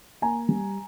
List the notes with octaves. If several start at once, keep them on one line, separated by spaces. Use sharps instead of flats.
A#3 G#5 A#5
G3